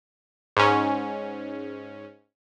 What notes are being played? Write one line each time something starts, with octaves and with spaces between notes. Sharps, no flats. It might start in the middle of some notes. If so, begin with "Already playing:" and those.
G#2 C#4